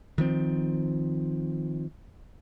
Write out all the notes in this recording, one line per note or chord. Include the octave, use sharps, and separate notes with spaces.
D#3 F3 C4